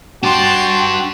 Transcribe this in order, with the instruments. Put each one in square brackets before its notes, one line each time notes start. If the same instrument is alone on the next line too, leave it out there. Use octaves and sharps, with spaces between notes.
[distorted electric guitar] D4 G4 [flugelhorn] F#4 [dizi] G5 [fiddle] A5 C6